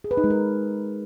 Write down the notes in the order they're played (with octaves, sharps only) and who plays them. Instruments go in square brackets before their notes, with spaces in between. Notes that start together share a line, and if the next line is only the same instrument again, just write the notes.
[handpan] G#4
B4
D#4
G#3
A#4